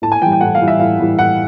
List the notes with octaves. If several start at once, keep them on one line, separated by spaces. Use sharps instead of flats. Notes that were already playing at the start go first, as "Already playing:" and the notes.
A2 A5
G#5
E3 G3 G5
G5
A2 F#5
F5
E3 G3
E5
A2 F5
E3 G3
A2 F#5